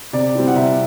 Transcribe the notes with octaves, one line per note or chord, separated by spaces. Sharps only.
C3 D5
G3 C4 E4
F#5
C3 E5